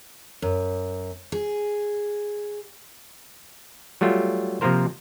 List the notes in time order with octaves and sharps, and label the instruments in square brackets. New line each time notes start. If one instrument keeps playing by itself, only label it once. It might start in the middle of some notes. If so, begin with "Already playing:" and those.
[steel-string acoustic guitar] F#2
G#4
[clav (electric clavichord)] F#3 G3 A3 F4
C3 F3 A#3 F4 A#4 C5